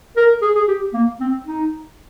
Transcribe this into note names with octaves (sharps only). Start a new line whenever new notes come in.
A#4
G#4
G#4
G4
A#3
C4
D#4